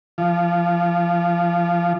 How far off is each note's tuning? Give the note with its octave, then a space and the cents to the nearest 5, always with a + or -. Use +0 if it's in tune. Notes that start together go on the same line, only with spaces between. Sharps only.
F3 -20